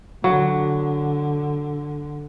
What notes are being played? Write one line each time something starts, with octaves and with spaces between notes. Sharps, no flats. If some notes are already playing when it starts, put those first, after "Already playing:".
D3 F#3